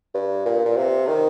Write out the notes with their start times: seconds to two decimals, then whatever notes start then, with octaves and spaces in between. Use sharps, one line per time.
0.15 G2
0.45 A#2
0.66 A#2
0.77 C3
1.07 D#3